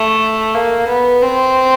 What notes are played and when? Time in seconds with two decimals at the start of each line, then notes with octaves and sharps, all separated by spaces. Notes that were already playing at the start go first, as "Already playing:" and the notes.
Already playing: A3
0.54 A#3
0.88 B3
1.22 C4